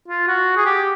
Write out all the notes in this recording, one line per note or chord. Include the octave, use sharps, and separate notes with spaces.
F4
F#4
G#4
G4